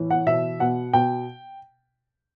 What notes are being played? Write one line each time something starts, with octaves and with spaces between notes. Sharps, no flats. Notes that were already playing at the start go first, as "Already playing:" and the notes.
Already playing: A2 E3
F#5
B2 E5
B2 F#5
B2 G5